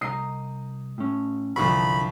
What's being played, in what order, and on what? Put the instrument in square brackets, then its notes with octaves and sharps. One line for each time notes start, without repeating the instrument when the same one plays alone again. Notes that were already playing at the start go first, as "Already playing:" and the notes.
[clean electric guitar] C2 D#5 A#5 [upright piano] D#6 C7
[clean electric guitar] A2 C#4
[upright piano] C2 F3 C#6 [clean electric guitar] F#2 D3 [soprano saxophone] B5